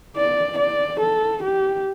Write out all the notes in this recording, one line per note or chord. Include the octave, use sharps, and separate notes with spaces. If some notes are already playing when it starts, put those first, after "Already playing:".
D5
D5
A4
G4